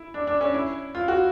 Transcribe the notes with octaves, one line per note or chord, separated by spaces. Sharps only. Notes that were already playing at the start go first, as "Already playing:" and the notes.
Already playing: E4
D4
D4
C#4
E4
F4
F#4